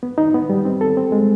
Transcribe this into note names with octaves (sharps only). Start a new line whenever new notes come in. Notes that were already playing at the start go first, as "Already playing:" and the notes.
B3
D#4
B3
G3
C4
A4
C4
G#3